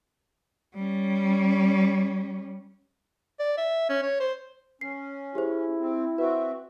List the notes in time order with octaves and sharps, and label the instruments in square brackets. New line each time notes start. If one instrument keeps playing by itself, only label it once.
[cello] G3 C#4
[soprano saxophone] D5
E5
C#4
C#5
C5
[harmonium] C#4 [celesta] C7
[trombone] E4 [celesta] G4 G#4 C5
[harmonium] C4
[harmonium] C4 F#4 E5 [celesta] B4